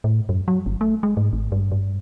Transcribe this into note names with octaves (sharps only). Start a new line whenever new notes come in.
A2
F#2
F#3
G1
A3
G#3
G#2
G#1
G2
G2